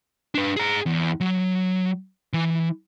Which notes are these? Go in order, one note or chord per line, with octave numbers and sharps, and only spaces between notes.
D4 B4
G#4 A#5
E2
F#3
E3